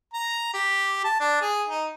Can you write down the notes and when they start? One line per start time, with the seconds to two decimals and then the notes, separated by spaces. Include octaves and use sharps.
0.14 A#5
0.54 G4
1.04 A5
1.21 D4
1.42 G#4
1.68 D#4